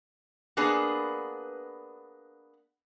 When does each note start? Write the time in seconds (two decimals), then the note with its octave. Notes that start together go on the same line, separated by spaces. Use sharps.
0.57 A#3 B3 D4 G#4 B4